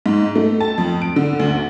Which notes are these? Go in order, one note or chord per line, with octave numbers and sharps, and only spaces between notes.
G#2
A3
A5
F2
D7
D3
D2